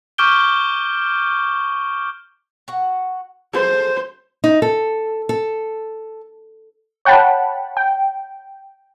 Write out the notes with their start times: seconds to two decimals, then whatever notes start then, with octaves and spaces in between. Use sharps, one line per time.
0.18 C#6 D6 F6 G6 D7 G7
2.68 F#4 F#5
3.53 G#3 A4 C5
4.44 D#4
4.62 A4
5.29 A4
7.05 C#5 F#5 G5 A5 B5
7.77 G5